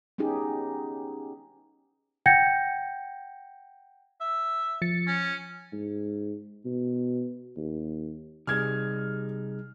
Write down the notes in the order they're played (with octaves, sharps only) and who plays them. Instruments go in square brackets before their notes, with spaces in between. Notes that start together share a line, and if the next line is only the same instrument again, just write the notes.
[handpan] B3 C#4 D#4 G4 G#4
[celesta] F#5 G5 G6 G#6 A#6 C#7
[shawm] E5
[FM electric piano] F3 A6 C#7
[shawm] C#4
[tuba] G#2
B2
D#2
[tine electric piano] C3 G#4 [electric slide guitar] G3 D#4 [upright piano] F6 G#6